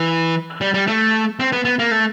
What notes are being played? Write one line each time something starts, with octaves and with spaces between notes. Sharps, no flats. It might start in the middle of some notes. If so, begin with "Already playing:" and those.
Already playing: E3
G3
G3
A3
C4
B3
B3
A#3
A3